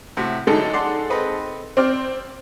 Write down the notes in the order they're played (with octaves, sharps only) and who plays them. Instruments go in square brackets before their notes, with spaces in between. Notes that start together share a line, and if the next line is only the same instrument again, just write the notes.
[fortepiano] A2 C3 F#4
[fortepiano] A1 D3 F#3 [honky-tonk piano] G#3 D#4 A4
[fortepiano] D5 F#5 C6
C4 B4 D#5
[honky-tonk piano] C4 [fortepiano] G4 D5 F6